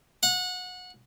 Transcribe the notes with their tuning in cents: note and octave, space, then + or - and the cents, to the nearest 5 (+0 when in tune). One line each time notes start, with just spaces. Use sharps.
F#5 -25